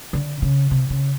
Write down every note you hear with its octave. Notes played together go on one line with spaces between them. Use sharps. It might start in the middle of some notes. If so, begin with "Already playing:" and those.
D3
C#3
C3
C#3